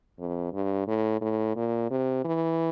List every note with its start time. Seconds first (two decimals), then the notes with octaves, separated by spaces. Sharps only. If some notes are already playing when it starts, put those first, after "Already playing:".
0.19 F2
0.53 G2
0.87 A2
1.21 A2
1.56 A#2
1.90 C3
2.25 E3